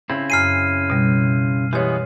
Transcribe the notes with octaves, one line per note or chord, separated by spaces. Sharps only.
C#3 C4 E4
F#2 G#5 F6 C7 D#7
B2 G3
E3 G#3 B3 G4 C#5